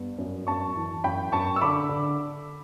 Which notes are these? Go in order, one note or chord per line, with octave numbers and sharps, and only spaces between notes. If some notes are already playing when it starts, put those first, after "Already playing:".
Already playing: G2 B3
F#2
F#2 A5 C#6
E3
F#2 G5 B5
F#2 A5 C#6
E6
D3 B5 D6
D3